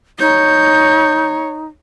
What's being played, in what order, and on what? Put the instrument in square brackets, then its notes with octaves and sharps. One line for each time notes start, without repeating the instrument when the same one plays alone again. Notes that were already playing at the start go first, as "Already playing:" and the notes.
[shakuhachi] D#4 [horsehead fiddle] C#5 [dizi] G6